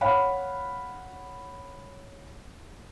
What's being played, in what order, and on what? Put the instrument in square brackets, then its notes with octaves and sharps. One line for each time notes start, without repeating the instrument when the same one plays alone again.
[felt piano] C#5 F5 F#5 B5